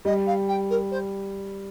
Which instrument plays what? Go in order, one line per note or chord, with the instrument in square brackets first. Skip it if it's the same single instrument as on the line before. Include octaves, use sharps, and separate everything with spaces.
[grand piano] G3 [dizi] D#5
[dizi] F5
G5
A#4
C5